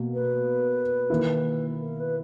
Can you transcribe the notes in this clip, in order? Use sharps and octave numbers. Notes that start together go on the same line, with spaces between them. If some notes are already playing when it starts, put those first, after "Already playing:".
Already playing: B2 A#3
B4
D#3 A#3 E4
A#4
B4